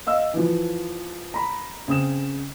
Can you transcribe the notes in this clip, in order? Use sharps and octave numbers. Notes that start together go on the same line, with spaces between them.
D#5 F5 E6
E3 F3
A#5 B5
C#3 C4 D#6 E7